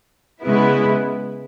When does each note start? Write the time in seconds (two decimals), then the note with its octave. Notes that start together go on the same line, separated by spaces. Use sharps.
0.42 C#3 G#3 B3 E4